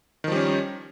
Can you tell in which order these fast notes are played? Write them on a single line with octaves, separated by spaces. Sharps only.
D#3 F3 G3 C#4